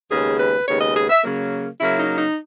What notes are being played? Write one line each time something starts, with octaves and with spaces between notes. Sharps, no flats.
D#2 C#3 G#3 B3 G#4
B4
D#2 C#3 G#3 B3 C#5
D#5
G#4
E5
C#3 F#3 A#3
C#3 F#3 A#3 E4
D#4
D#4